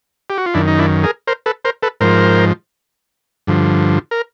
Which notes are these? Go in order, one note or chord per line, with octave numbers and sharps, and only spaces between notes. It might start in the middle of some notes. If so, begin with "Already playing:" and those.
G4
F#4
F4
F#2 D#3 D4 E4
D#4
D4 E4
G#4 A#4
A#4 C5
A4 B4
A#4 C5
A4 B4
G#2 F3 A#4 C5
G2 D3 F3
A#4